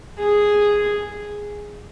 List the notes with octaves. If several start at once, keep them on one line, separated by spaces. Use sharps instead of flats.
G#4